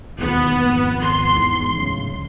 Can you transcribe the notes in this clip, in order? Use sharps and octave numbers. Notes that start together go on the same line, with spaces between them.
E1 D#2 B3
G#1 F2
C6
E2 G#2
D1 C#3